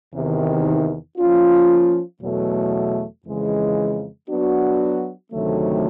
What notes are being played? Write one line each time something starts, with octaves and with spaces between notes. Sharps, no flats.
E2 C3 D#3
F3 A#3 C#4 F4
E2 B2 F#3 A3
F2 C#3 E3 G#3
F#3 B3 D4 F#4
D2 C3 D#3 F#3 A3